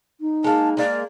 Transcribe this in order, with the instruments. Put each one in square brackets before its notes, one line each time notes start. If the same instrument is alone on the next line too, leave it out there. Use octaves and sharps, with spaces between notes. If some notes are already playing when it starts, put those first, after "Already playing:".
[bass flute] D#4
[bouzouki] G#3 A#3 [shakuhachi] A5
[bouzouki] G#3 A#3 [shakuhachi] D5